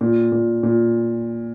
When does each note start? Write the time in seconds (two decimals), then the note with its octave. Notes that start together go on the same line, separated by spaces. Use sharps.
0.01 A#2
0.32 A#2
0.63 A#2